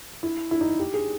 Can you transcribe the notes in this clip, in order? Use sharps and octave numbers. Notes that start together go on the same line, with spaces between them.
E4
E4
D#4
G4
G#4